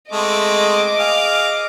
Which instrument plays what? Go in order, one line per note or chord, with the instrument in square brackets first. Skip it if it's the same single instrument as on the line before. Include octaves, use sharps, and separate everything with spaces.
[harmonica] G#3 A3 C4 [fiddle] D#5 D6
[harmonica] G#4 F5